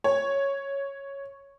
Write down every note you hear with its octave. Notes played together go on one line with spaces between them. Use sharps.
C#5